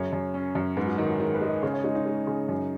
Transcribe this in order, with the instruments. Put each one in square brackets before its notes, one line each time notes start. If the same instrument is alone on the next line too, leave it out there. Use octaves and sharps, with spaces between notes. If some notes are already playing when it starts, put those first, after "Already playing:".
Already playing: [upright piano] F#2 C#3 [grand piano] C#5
[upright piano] F#2
C#4
F#2
[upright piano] G#2 [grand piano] B4
[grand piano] F#4
[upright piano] D#3 [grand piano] D#4
[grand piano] F#4
[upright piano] D#3 [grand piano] G#4
[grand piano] B4
[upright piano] G#3
[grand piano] D#5
[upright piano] C#3 [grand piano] C#5
[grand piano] C#5
[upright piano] G#3 [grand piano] D#4
[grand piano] D#4
[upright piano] G#3
C#3
F#2